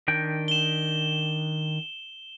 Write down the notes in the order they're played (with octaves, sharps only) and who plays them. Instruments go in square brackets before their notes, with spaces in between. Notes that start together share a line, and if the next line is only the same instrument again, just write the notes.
[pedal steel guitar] D#3 D4 G5
[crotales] E7 G7